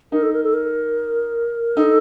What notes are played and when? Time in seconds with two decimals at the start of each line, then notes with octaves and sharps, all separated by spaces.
0.12 D#4 A#4
0.23 A4
0.33 A#4
0.44 A4
0.54 A#4
1.77 D#4 A4